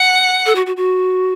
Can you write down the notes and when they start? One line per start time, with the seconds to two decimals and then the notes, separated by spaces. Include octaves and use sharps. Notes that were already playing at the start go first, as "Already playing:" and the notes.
Already playing: F#5
0.46 A4
0.55 F#4
0.66 F#4
0.77 F#4